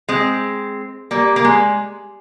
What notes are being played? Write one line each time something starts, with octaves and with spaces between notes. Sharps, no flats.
G#3 C4
G3 A#3
A#3
G#3